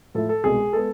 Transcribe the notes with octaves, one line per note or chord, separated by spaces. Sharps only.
A2 F3 A3 A4
A4
C2 B2 G#3 G#4
G#3 B3 A4